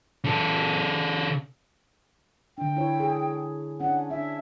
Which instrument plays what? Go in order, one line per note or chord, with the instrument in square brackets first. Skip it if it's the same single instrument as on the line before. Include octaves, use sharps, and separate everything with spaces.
[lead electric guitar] C#3 A4
[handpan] D3 D4 [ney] G5
[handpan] E4 C#5
G#4
[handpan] C#4 D4 [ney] F#5
[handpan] D4 [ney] E5